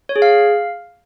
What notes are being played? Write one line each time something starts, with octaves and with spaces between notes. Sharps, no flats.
C#5
G#4
F5